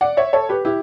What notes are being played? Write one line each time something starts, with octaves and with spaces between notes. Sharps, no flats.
D5 F#5
C#5 E5
A4 C#5
G4 B4
E4 G4